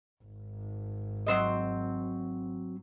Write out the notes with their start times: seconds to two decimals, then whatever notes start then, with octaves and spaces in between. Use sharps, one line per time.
0.24 G#1
1.27 F#3 C4 D#5